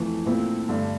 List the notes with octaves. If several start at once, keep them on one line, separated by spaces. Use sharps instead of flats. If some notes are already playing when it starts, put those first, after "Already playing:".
Already playing: F2 E3 A3
A#2 A3 C4 E4
G2 D3 A3 D4